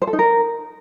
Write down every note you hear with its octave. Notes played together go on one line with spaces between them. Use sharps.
C5
A4
D#4
A#4